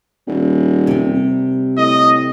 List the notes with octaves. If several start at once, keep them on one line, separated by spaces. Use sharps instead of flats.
D#1
C3 G3
A2 D#5